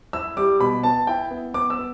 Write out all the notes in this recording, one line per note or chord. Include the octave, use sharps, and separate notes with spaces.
E4 E6
G3 D6
B2 B5
B3 A5
E4 G5
B3
B3 D6
E6
B3